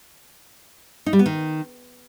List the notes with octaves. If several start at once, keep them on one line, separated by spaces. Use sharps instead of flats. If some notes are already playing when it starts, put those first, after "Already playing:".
D#4
G3
B3
D#3